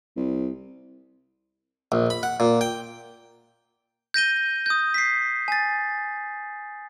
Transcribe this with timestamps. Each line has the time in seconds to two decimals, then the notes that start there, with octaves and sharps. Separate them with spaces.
0.16 C2
1.92 A#1
2.10 B5
2.23 F#5
2.40 A#2
2.61 G5
4.14 G6 A#6 D#7 G7
4.66 D#6 G6
4.94 B6 C7
5.48 G#5 A6